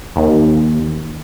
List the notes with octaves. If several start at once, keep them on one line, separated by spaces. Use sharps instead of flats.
D#2